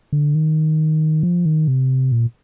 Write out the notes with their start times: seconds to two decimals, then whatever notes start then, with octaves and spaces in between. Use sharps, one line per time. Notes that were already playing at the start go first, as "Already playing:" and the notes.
0.13 D3
0.35 D#3
1.23 F3
1.45 D#3
1.68 C3
2.12 A#2